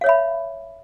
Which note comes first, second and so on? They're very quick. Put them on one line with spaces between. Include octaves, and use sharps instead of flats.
F5 C#5 E5 B5